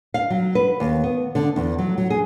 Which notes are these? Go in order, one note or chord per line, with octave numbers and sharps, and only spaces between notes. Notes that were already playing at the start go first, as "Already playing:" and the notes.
F5
F#3
B4
D#2
B3
D3
E2
F#3
F#3
G#4